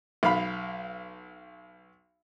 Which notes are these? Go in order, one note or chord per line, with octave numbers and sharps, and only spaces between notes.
B1 F5 B5